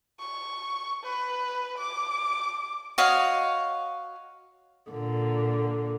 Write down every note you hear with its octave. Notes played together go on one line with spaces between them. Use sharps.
C#6
B4
D6
F#4 C#5 D#5 F5
A#2 D3